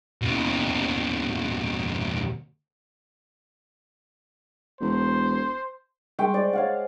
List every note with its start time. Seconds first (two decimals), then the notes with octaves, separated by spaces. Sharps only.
0.22 D#2 B2
4.81 E1 C5
6.19 G3 G#3 G5 C6 C#6
6.34 C5 D5 D#5
6.53 C#5 F5 F#5